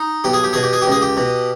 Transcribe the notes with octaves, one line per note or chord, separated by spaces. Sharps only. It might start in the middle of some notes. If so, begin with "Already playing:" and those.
Already playing: D#4
B1 G4
G#4
G4
B2 G#4
G4
G#4
G4
C#2 G#4
G4
B2